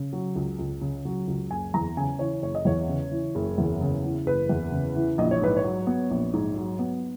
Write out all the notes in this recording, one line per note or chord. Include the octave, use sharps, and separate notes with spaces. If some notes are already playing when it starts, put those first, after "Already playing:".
Already playing: C#3
F#3
C#2
C#2
C#3
F#3
C#2
F#1 G#5
E2 A#5
C#3 G#5
E3 C#5
F#1 C#5
D#5
E2 C#5
C#3
E3
F#1
E2
C#3
E3
F#1 B4
E2
C#3
E3
A#1 D#5
C#5
G#2 B4
C#5
F#3
B3
A#1
G#2
F#3
B3